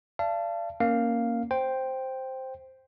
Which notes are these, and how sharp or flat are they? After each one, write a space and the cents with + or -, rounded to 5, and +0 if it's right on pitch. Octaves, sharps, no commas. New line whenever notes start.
D5 -5 F5 -40 A5 +0
A#3 +0 C#4 +0 F5 +0
C5 +0 G5 +0